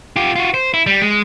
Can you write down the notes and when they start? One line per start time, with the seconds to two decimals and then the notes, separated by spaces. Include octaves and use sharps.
0.16 F4 G4
0.36 F4 F#4
0.54 C5
0.74 E4
0.86 G3
1.02 G#3